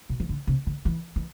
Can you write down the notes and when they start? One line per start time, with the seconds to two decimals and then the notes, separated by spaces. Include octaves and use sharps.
0.10 B2
0.20 E3
0.29 D3
0.47 C3
0.67 D3
0.85 E3
1.16 E3